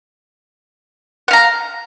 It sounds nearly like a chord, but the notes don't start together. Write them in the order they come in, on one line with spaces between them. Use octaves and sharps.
F#5 F5 A#5